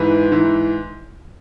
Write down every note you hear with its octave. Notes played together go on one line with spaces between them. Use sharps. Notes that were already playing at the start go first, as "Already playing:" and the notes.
Already playing: G#2 E3 B4
G#2 E3